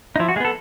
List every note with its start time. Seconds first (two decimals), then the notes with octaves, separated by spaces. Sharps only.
0.16 D#4
0.20 F3 E4
0.29 F#4
0.36 G#3 G#4
0.40 B3 A4